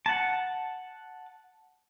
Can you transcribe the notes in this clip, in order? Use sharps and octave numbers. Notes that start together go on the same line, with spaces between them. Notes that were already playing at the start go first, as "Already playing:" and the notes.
F#5 A5